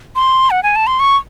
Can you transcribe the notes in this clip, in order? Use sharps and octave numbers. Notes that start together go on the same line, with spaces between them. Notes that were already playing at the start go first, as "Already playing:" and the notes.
C6
F#5
G#5
A5
C6
C#6